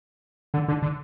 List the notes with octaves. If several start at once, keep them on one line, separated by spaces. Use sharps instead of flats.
D3
D3
D3